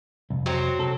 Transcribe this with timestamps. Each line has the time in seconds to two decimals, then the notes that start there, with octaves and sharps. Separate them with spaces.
0.30 C2 F2
0.46 F#3 C4
0.80 C2 A4